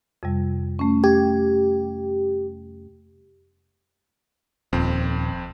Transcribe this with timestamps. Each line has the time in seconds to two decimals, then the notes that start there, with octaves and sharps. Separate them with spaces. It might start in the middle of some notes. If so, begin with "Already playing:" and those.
0.23 F2 C3 G3
0.79 A3 C#4
1.04 G4 G#6
4.73 D#1 F2 C4